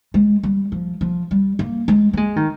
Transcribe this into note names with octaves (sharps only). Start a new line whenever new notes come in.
G#3
G3
F3
F3
G3
A#3
G#3
A#3
G#3
D#3